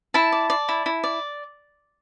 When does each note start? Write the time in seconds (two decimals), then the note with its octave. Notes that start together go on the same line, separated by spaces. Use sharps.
0.14 E4 A5
0.32 D5
0.50 D5
0.69 E4
0.86 E4
1.04 D5